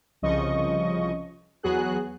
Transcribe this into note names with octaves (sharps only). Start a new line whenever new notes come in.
C2 C#3 F3 D#5 C#6
E2 F#3 B3 F#4 G#4 F#6